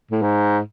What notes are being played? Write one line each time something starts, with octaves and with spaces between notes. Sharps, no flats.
A2
G#2